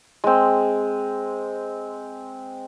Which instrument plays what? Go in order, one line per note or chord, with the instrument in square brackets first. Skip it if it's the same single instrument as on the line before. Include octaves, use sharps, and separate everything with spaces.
[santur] G#3 C4